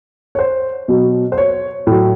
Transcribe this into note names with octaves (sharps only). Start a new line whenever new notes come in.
C#5
C5
B2 F#3
C5
C#5
A2 F#3